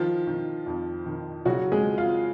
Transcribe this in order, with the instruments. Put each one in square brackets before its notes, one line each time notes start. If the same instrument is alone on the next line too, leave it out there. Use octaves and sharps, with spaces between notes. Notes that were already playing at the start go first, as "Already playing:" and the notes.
Already playing: [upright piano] D#3 F3 F4
D#3
F2
D#3
C#3 F#3 F#4
G#3 G#4
F3
F4 F5